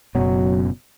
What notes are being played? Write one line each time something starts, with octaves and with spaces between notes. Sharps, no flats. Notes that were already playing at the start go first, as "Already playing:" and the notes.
F#1 F#2 B2 F#3